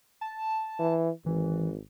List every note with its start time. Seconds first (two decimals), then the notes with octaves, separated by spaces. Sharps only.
0.21 A5
0.79 E3
1.26 G#1 E3